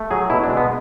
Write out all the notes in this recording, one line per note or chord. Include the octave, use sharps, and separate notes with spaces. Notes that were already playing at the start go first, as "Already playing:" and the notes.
Already playing: A3
F#3 G#4
B2 E4
D4
G#3
B3